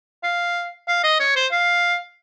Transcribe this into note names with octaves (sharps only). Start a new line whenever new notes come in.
F5
F5
D#5
C#5
C5
F5